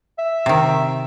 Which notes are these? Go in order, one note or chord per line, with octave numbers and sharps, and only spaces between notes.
E5
C3 D#3